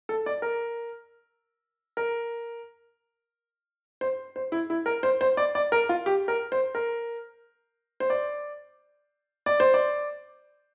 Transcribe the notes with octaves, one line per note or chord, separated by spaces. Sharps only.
A4
D5
A#4
A#4
C5
C5
E4
E4
A#4
C5
C5
D5
D5
A#4
F4
G4
A#4
C5
A#4
C5
D5
D5
C5
D5